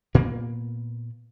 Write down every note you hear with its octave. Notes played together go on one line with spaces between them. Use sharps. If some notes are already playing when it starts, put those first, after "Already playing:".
A#2 A#3 B3